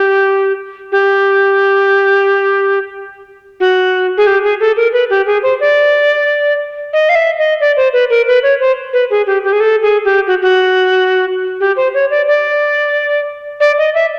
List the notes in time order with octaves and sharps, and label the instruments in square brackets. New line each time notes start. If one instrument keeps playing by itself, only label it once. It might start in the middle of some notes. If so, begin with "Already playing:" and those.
Already playing: [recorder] G4
G4
F#4
G#4
G4
G#4
A4
A#4
B4
G4
G#4
C5
D5
D#5
F5
E5
D#5
D5
C5
B4
A#4
B4
C#5
C5
B4
G#4
G4
G4
G#4
A4
G#4
G4
F#4
F#4
G4
C5
C#5
D5
D5
D5
D#5
E5